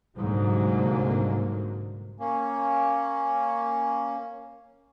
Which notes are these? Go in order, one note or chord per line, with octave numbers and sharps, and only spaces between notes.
C2 G#2 D3 F#3 A#3
A#3 C#4